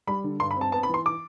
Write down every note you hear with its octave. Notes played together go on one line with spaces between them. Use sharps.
G3 B5
D3
G2 C6
B5
C4 A5
B3 A5
B5
E3 C6
D6